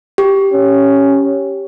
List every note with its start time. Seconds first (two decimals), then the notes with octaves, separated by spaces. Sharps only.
0.18 G4
0.53 C#4